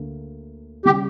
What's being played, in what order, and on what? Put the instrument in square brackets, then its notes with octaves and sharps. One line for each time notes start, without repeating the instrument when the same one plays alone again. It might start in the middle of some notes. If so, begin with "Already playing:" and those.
Already playing: [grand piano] D2 D3 A#3
[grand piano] C#3 G3 [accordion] G4